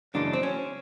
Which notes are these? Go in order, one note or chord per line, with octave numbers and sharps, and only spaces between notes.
F#2 C#3 E3 G#3 D4
C4
C#4